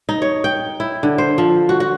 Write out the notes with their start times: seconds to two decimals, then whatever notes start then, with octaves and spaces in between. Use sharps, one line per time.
0.09 D#4
0.22 C#5
0.44 G5
0.80 E4
1.03 D3
1.18 C5
1.38 F3
1.69 F#4
1.80 F#4